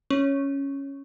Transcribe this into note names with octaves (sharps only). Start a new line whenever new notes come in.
C#4